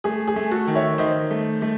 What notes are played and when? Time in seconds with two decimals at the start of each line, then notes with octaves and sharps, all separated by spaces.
0.04 A3 G#4
0.27 G#4
0.36 A3
0.51 F#4 A4
0.67 D#3
0.75 C#5 E5
0.98 D#3 C5 D#5
1.31 A3
1.62 A3